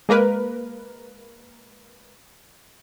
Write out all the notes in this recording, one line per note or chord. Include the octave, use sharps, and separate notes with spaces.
G#3 A#3 A#4 B4